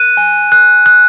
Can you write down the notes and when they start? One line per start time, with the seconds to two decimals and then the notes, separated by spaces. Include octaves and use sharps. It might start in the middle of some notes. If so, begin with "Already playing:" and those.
Already playing: F#6 D#7
0.17 G#5
0.52 F#6
0.86 F#6